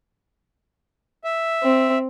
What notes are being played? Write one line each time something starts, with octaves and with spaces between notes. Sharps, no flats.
E5
C4